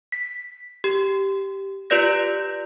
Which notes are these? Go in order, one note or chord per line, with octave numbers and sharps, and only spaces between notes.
B6
G4
F4 G4 B4 D5 G6 A#6